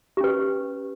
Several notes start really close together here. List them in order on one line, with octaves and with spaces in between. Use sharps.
G4 C#4 B4